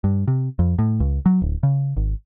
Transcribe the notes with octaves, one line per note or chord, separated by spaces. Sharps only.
G2
C3
F2
A2
C#2
F#3
D1
C#3
G#1